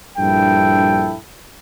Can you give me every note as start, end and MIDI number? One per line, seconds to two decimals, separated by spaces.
0.17 1.16 34
0.17 1.16 43
0.17 1.16 64
0.17 1.16 69
0.17 1.16 79